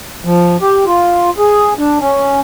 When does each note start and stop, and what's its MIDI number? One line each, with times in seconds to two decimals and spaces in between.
0.25 0.56 53
0.61 0.84 67
0.86 1.30 65
1.38 1.74 68
1.78 1.98 62
2.00 2.40 61